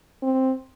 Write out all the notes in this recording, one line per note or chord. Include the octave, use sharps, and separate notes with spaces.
C4